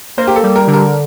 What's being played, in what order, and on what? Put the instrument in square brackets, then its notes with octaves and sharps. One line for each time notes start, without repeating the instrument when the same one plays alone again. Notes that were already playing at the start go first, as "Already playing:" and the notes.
[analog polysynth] A#3 [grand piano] C5
[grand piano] G4
A4
[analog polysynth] G3
[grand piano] A#4
[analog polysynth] D3
[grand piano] A#4